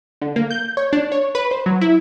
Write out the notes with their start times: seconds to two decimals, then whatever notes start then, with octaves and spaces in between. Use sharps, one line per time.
0.22 D3
0.36 A#3
0.50 G6
0.77 C#5
0.93 D4
1.12 C#5
1.35 B4
1.51 C5
1.66 F#3
1.81 E4